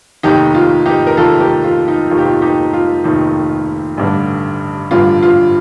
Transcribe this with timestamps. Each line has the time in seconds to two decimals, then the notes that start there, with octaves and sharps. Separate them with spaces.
0.23 F1 D#2 D#3 D#4 G4
0.55 F4
0.86 D#4 G4
1.07 A#4
1.17 F1 D#2 D#3 F4 A4
1.40 G4 A#4
1.64 F4
1.88 D#4
2.10 F1 D#2 D#3 F4
2.18 G4
2.25 F4
2.42 D#4 G4
2.74 F4
3.04 F1 D#2 D#3 D#4
3.97 A1 G2 D3
4.91 A1 G2 D3 F4
5.23 F4